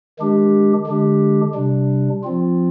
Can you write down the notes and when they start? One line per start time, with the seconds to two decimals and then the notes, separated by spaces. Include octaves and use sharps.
0.19 D#3 G#3 D4 G4
0.87 D3 G#3 D4 G4
1.54 C3 G3 D4
2.23 F3 C4 F4